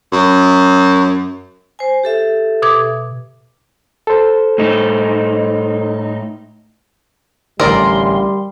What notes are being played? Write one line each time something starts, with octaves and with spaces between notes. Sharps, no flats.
F#2
C5 G#5
G4 A4 E5
B2 D6 G#6
A4 C5
A2 D#4
A1 D3 G3 A#4 D5 C6